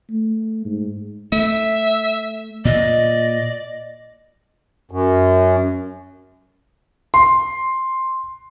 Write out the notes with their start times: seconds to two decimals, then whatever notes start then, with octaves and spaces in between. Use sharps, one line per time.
0.10 A3
0.65 G#2
1.32 A3 E5
2.65 A#2 D5 D#5
4.91 F#2
7.14 C6